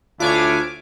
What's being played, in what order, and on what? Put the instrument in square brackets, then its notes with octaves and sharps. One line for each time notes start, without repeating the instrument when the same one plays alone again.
[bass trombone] D2 [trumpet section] D4 E4 C#5 [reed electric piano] F4 [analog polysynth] F5 G#5 D6